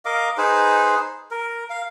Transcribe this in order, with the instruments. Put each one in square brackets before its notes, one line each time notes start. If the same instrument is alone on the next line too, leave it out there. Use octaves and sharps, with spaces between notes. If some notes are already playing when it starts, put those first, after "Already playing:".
[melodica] A#4 D#5 F5 D6
D#4 G#4 B4 C5
A#4
F5